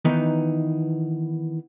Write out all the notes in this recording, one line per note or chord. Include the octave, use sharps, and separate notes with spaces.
D#3 E3 B3 D#4